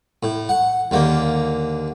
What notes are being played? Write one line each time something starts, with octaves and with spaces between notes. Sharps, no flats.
A2
F#5
D#2 D3 A#3